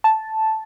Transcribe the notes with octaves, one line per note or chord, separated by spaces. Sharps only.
A5